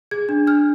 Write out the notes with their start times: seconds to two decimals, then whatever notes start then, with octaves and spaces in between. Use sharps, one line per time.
0.11 G#4 G#6
0.29 D4
0.47 D4 F6